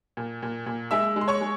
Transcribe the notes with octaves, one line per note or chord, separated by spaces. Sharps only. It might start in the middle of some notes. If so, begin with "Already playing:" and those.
A#2
A#2
A#2
G#3 E5 E6
G#3
C6
C#5 C#6
G#3